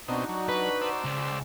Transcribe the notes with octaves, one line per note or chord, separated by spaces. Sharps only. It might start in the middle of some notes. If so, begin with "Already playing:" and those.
B2 C4 D4 D#4 F#4 D#5
F#3
B4
C5 D5 E6
C#2